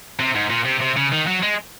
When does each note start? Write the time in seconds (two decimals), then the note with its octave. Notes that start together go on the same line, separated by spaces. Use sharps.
0.20 C3
0.35 G#2
0.50 A#2
0.65 C3
0.81 C3
0.97 C#3
1.12 D#3
1.27 F#3
1.42 G#3